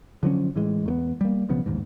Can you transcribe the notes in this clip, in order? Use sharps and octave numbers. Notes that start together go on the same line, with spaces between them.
D3 F3 F#3 C#4
A2 E3 G#3
E2 A3 B3
G3 A#3
B1 C#3 F3 B3
A1 D#2 G#2